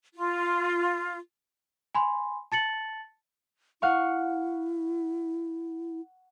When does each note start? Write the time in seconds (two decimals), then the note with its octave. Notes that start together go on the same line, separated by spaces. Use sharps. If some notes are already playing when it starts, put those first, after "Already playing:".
0.15 F4
1.95 G#5 B5 C6
2.52 A5 A6 C#7 F#7
3.82 E4 F5 F#5 C#6